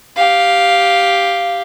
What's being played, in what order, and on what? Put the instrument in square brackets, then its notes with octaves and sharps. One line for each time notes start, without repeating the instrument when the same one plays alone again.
[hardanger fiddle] G4 F5